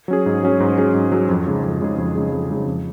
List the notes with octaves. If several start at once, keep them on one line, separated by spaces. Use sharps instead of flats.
F#3 C#4 G#4
G#2
F#3 C#4 G#4
G#2
F#3 C#4 G#4
G#2
F#3 C#4 G#4
F2
C#3 G#3 D#4 G#4
F2
C#3 G#3 D#4 G#4
F2
C#3 G#3 D#4 G#4
F2
C#3 G#3 D#4 G#4
F2